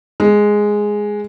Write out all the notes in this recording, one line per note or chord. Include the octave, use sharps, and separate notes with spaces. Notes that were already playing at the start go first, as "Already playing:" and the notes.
G#3